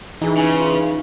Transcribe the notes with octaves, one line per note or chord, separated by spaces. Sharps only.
E3 D#4 G#4
C#3 G#5
F4
F5